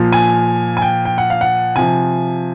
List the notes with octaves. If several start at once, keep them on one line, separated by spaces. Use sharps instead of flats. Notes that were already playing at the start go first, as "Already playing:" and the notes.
Already playing: A#2 F3
G#5
G#5
G5
G5
F#5
F5
F#5
C3 F3 G#5